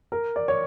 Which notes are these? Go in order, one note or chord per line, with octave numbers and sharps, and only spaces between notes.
A#4
D5
C#5